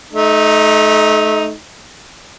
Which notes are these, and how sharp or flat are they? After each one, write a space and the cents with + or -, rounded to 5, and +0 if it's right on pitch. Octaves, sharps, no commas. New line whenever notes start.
A3 -30 D#4 +0